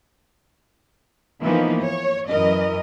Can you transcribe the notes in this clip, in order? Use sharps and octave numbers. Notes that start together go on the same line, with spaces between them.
E3 F3 A#3 B3 D#4
C#5
F#2 E3 A#4 D#5